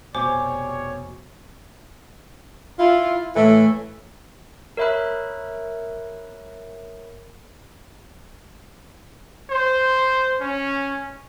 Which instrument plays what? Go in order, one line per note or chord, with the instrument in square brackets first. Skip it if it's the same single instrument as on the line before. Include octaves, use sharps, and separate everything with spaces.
[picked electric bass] F1 B2 [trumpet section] G3 G#4 C#5 [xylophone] C5 [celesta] G#5 D6
[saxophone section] E4 F4
A2 E3 A3
[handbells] A#4 C#5 E5 B5 F#6
[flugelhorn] C5
C#4